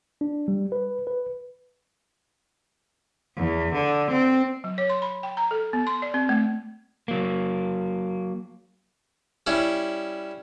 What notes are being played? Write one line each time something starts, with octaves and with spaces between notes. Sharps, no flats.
D4
G3
B4
B4
E2
D3
C4
F#3
C#5
C6
B5
G5
A#5
A4
B3
C6
D5
C4
A3
F#3 A#3
G3 C#4 E4